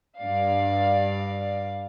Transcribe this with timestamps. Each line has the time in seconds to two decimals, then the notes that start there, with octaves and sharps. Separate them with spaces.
0.18 G2 D5 F5